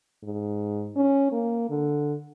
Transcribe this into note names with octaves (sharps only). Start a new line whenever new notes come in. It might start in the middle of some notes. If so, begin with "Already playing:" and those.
G#2
C#4
A#3
D3